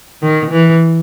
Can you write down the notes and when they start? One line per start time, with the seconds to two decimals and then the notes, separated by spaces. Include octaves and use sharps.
0.22 D#3
0.51 E3